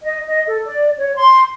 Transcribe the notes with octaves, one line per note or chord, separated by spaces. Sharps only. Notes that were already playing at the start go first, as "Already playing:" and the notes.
D#5
D#5
A4
D5
C#5
C6